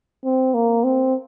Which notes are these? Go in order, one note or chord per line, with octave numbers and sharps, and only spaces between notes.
C4
A#3
C4